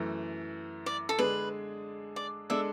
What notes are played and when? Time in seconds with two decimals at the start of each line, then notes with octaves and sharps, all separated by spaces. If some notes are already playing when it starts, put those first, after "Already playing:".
Already playing: F#2 E3 A3
0.86 D5
1.09 A4
1.18 D3 G#3 D4 G#4 B4
2.16 D5
2.50 G#3 D4 A4 D5 E5